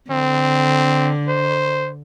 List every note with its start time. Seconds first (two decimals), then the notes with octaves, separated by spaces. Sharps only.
0.11 D3 C4
1.28 C5